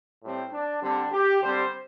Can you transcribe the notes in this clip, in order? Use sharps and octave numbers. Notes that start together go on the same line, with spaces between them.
A2 G3 C4
D4
D3 G3 C4 D4
G4
D3 G3 C4 C5